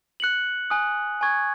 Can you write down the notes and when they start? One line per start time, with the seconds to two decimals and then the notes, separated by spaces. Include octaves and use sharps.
0.20 F#6 C#7 F#7
0.70 G#5 D#6 F#6
1.21 G#5 C#6 G#6